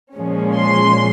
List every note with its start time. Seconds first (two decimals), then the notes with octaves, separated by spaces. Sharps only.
0.15 A#2 F3 G#3 C#4
0.57 C6